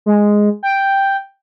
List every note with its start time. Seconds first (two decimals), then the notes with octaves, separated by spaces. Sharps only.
0.06 G#3
0.63 G5